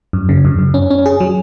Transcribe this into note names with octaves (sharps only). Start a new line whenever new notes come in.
F#2
C#3
F#2
F#2
C#4
C#4
G#4
F#3